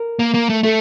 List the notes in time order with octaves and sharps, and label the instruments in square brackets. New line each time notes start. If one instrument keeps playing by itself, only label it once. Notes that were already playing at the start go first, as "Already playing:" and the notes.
Already playing: [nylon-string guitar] A#4
[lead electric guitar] A#3
A#3
A3
[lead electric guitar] A3 [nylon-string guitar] A4